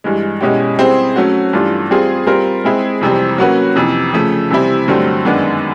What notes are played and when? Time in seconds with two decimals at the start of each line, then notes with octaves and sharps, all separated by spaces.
0.04 G2 E3 G#3
0.41 B2 G#3 C#4 E4 G4
0.78 G3 C4 E4 G#4 C5
1.16 F#3 A3 C#4 F#4
1.53 G2 E3 A3 D4 F4
1.90 G3 C4 F4 G#4
2.26 G3 C4 F4 A#4
2.64 G#3 C4 E4 G#4
3.01 F2 C3 E3 G3 C4
3.38 F#3 A#3 C#4 F#4 B4
3.75 F2 C3 E3
4.13 C#3 F3 A3
4.51 C3 E3 G3 C4 E4
4.88 G2 D3 F#3 A3 C4
5.25 F#2 D#3 G#3 B3 D4